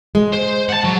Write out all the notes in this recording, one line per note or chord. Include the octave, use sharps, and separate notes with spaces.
G#3
C5
F#5 A5
F#3